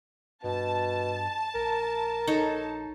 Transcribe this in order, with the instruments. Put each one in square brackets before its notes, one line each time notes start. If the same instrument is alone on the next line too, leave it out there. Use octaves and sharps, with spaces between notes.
[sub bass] G2 [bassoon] B2 [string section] A5
[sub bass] A#1 [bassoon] A#4
[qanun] D#4 A4 C#5